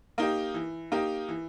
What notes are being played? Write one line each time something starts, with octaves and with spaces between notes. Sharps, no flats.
A#3 D#4 G4
E3
A#3 D#4 G4
E3